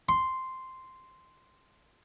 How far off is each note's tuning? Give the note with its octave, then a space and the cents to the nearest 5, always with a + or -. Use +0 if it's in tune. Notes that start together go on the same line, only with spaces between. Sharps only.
C6 -5